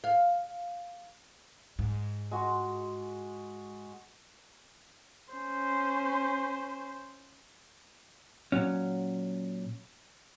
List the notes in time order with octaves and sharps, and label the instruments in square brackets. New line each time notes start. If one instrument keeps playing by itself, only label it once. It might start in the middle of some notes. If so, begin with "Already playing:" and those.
[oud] F5
[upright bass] G#2
[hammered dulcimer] G#3 F#4
[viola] C#4 C5
[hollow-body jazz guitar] A#2 F#3 C#4